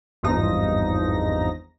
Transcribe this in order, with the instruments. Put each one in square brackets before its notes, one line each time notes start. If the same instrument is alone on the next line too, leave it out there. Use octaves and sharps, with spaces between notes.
[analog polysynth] G#1 E2 G2 F3 D#4 A#6